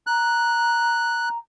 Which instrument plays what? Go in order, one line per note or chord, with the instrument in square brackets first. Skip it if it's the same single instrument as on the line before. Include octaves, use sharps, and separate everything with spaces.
[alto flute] A#5 [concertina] F#6